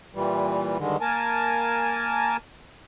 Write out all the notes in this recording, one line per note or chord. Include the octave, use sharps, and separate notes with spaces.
A#2 E3 G3
G2 D3 D#3 G#3
A#3 A#4 G#5 A5